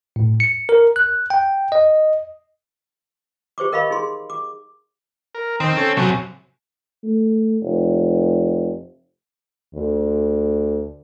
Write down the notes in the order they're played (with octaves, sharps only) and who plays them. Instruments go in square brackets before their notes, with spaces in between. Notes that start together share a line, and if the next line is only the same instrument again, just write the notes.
[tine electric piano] A2
C#7
A#4
F#6
G5
D#5
[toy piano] G4 C5 C#6 D6
A#4 D#5 F5 B5 C#6
D#4 G#4 C6
D6
[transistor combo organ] A#4
[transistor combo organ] D#3 [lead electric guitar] C4
[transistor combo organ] C#4 A4
[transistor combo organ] C3 F#3 [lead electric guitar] A3 C#4
[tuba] A3
F1
[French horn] D2